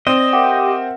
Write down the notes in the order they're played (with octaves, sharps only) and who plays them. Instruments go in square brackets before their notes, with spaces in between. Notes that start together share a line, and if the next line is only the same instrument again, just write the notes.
[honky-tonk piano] C4 [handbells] D5 [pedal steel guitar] D#5
[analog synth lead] G4 [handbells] A#4 E5 F#5